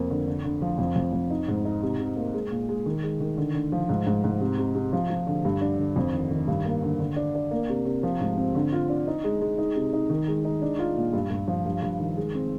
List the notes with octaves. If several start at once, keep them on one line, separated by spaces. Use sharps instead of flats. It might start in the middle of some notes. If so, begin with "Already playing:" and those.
Already playing: F2 A#3
D3
D3
D3
F3
F2
F2
F2
D#4
G#2
D#4
C3
C3
A#3
G#3
A#2
G#3
D#3
G#3
D#3
D3
D3
F3
G#2
G#2
G#2
C3
C3
C3
F3
F3
D3
G2
D4
D3
F2
D#3
D#3
G2
A#3
D3
D3
D4
D4
A#3
C3
C3
F3
G#2
C4
D3
F4
D4
D#4
G#3
G#3
D#4
C3
D#4
D#3
G#3
D#4
D4
F4
A#2
G2
G2
F3
G2
G2
D#3
G#3
C4